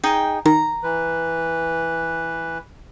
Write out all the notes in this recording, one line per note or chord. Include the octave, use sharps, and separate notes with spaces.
D#4 G#4 G5
D#3 A#5
E3 B4